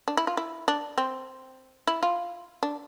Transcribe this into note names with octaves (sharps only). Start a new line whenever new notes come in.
D4
E4
F4
E4
D4
C4
E4
F4
D4